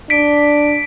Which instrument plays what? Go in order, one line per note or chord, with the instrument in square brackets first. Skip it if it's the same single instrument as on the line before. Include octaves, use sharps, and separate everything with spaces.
[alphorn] D4 [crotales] B6 D7